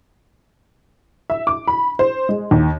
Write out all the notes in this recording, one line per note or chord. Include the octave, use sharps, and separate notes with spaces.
E5
D6
B5
C5
G#3
D#2